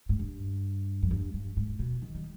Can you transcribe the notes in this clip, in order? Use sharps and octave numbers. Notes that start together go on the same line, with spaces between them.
G#2
G2
F2
G2
G2
G#2
B2
D#3
G3